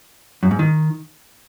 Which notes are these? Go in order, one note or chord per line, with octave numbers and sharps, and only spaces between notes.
F#2
G#2
D#3